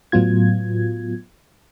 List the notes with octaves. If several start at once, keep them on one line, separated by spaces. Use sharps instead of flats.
A2 F#3 B3 F4 G#6